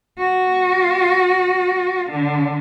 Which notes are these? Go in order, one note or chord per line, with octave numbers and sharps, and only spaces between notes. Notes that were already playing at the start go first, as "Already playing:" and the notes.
F#4
D3